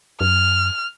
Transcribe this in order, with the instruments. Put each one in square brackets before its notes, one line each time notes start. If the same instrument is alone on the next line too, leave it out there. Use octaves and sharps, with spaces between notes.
[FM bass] F#2 [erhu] F6